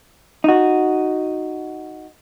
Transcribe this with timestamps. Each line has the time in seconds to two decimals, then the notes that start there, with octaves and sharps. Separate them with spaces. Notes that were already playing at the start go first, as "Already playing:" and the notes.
0.44 D#4 F#4